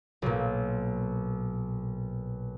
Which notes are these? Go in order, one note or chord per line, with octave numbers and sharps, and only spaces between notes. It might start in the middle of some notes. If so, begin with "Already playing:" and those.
B1 A#2